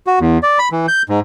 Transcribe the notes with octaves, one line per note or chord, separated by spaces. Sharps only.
F#4
E2
D5
B5
E3
G6
G#2